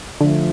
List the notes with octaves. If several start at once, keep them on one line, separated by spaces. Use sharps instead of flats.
D3 F3 A3